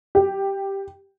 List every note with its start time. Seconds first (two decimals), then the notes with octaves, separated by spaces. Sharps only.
0.15 G4